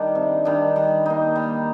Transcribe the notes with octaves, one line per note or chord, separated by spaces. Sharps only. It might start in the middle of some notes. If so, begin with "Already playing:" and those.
Already playing: D#3 G3 D4
C3
D#3 G3 D4
G3
A#3 D#4
G3